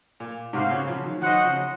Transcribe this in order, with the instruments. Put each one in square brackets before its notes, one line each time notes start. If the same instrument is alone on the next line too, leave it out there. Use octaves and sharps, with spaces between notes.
[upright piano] A#2
[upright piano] G#2 C3 [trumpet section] F#4 C5 F5
[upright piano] A#2 C#3
C#3 F3
D#3 F#3
[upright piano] D#3 F#3 [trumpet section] F#4 C5 D#5 F#5
[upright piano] C#3 F3